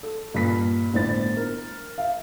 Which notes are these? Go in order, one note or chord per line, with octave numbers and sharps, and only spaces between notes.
A4
G2 A#2 A#3 B6
G1 A2 D4 C5 A6
A#4
E5 F5